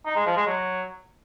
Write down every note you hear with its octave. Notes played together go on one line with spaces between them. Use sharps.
D#4
G#3
F3
G#3
F#3